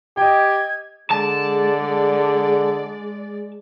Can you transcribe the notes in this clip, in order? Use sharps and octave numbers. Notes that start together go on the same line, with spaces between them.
G4 D#5 G5 G#6
D3 G#3 D5 A5